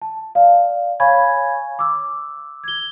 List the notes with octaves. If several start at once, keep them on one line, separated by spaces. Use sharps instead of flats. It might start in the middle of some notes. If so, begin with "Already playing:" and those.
A5
D5 F5
C#5 F5 G#5 B5 C#6 G#6
D6 E6
G#6 G7